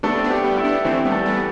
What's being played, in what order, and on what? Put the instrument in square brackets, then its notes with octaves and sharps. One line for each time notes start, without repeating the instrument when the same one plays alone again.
[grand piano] A3 [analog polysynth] B3 D4
[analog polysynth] C4
B3 D4
[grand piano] G4
[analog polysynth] G3 B3
[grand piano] E4
[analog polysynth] B3 D4
[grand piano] E3 [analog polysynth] A3 C4
[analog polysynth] G3 B3
[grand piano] A3
[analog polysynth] G3 B3